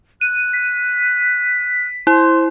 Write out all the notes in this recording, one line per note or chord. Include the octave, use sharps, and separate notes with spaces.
F#6 D#7
B6
E4 C5 C6